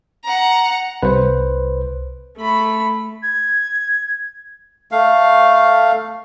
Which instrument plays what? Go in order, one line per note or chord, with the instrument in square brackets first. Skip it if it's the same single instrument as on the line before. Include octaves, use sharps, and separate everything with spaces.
[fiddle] F#5 A#5
[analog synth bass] C2 [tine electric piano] B4 C5
[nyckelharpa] A3 B5
[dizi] G#6
[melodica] A3 F5